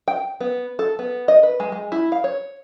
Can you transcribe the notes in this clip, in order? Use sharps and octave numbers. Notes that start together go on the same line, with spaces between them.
G5
B3
A4
B3
D#5
B4
G#3
G#3
E4
F5
C#5